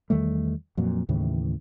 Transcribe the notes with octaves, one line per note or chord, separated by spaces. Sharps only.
E2 D#3 G3 A3
F2 A#2 F#3
D#2 A2 C#3 E3